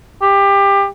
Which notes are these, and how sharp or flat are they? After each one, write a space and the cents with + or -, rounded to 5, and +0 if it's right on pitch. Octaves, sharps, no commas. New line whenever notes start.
G4 +20